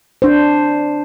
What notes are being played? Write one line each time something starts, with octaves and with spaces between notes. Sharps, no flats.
D4 C5